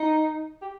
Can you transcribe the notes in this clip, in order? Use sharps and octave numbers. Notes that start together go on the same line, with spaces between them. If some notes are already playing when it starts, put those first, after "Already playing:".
Already playing: D#4
G4